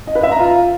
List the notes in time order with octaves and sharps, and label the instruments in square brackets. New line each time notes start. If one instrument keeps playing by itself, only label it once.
[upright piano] D#5
B4
E5
A#5
F4